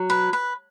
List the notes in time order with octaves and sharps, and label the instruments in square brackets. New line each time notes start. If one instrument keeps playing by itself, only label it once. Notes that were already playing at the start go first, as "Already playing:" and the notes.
Already playing: [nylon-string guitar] F#3
[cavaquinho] B4
B4